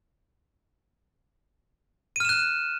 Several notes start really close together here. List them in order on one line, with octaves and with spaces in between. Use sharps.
D#7 F6 E7 F#6